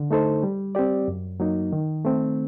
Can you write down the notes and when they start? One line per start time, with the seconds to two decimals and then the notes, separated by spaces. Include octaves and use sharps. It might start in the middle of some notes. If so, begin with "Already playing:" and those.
Already playing: D3
0.11 A3 D#4 A4 C5
0.43 G3
0.75 C4 G4 D5
1.08 F#2
1.40 F#3 A#3 D#4
1.73 D#3
2.05 A3 C4